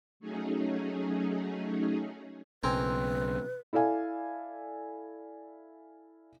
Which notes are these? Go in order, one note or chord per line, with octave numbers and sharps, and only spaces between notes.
F#3 A3 C#4 D#4 G#4
B1 C#3 C4 A#4 B4 G#5
E4 A4 D5 F5 G#5